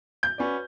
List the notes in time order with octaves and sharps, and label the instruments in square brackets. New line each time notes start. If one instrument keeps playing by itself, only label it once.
[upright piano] G6
[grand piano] C#4 F#4 B4 D5